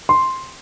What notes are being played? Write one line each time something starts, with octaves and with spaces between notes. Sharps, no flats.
C6